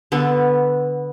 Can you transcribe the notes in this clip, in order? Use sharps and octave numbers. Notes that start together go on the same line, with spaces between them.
D3 B3 A4 B4